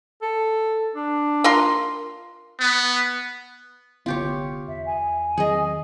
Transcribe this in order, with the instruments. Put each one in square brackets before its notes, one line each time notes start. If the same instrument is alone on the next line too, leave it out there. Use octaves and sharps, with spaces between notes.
[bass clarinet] A4
D4
[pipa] A#3 F4 C6
[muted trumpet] B3
[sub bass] D#1 [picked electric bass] C2 D3 B3 [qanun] F4 G4 C#5
[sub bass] E2 [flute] E5
[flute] G#5
[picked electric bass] D#3 F#3 C4 [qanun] G#4 D#5